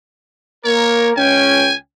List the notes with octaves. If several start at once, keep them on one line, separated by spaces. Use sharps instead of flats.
A#3 A#4 C#5
C#2 C#4 G5 G#5